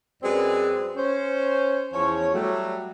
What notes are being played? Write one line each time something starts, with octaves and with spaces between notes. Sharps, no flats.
F#2 G#3 C4 G#4 B4 D5
C#4 C5
E2 F3 C#4 C#5
F#3 G3 A3